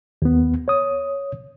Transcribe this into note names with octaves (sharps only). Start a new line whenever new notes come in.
D#2 B3
C#5 D#6